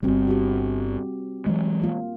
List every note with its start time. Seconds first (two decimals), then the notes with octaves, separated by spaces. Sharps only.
0.03 D1 G1 G3 C4 F#4
0.28 F#4 G4
1.46 E3 F#3 G#3
1.82 A#3 F4